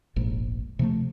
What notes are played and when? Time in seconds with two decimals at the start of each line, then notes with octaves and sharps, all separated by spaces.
0.16 F1 A#1 F2 G#2
0.79 C3 F3 G#3 A3